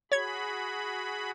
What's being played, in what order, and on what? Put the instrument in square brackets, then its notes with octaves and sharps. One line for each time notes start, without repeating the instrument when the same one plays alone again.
[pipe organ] F#4 G#4 B5 [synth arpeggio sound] C#5 G#6